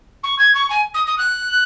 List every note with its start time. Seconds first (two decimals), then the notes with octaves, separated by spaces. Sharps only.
0.23 C#6
0.38 G#6
0.54 C#6
0.70 G#5
0.94 D#6
1.06 D#6
1.17 F#6